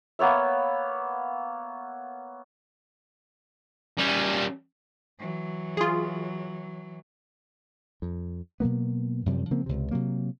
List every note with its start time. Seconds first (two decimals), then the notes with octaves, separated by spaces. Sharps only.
0.19 A#3 B3 C#5 E5
3.99 G3 C#4
5.19 E3 F#3
5.77 F4 G#4
8.02 F2
8.60 B2 F#3 A#3 B3
9.26 F#2 C3 F3 G3
9.51 C#3 F3 A#3 C4
9.66 C#2 C3
9.91 C3 F#3 A#3